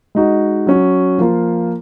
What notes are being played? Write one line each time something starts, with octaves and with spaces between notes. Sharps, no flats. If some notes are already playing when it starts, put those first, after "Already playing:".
G#3 D#4 F#4
F#3 C#4 F#4
F3 A#3 F4